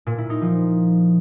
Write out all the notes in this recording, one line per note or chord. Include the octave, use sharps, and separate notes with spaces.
A#2
E4
D#4
F3